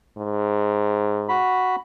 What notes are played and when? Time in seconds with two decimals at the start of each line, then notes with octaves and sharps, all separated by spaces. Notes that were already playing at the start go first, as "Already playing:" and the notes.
0.17 G#2
1.29 F#4 B5